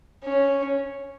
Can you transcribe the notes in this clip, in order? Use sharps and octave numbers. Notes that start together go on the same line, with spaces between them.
C#4